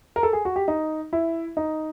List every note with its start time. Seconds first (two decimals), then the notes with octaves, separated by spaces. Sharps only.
0.16 A#4
0.23 A4
0.33 G#4
0.45 F#4
0.56 G4
0.68 D#4
1.13 E4
1.57 D#4